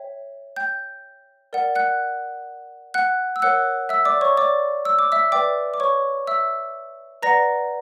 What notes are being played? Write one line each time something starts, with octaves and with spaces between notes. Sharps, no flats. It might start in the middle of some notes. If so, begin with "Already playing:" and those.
Already playing: C#5 E5 G5
G5 G6
A#4 D5 F#5
F#5 F#6
F#5 F#6
E6
A#4 C#5 F#5 F#6
E5 E6
D5 D6
C#5 C#6
D5 D6
E6
D6
E5 E6
B4 D5 E5 G5 D6
D6
C#5 C#6
E5 E6
B4 D5 F#5 A#5 A#6